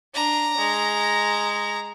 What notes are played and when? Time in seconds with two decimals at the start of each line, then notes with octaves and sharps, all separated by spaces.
0.14 D4 A#5
0.57 G#3